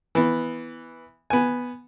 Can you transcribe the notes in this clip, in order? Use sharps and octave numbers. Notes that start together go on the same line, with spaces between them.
E3 B3
B3 G#5